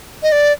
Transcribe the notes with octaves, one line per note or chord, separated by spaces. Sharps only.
D#5
D5